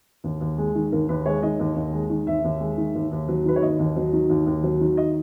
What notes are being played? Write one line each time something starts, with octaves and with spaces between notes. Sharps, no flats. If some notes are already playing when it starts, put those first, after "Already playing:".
D#2
D#2
G#3
D#3
D#2 A#4
D#2 B4
G#3 C#5
D#3 D#5
D#2
D#2
G#3
D#3
D#2 E5
D#2
G#3
D#3
D#2
D#2
F#3
D#3 B4
C#5
D#2 D#5
D#2
F#3
D#3
D#2
D#2
F#3
D#3
D#5